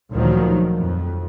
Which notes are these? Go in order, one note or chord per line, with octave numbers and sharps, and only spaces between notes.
D2 A#2 D#3 F3 F#3
F2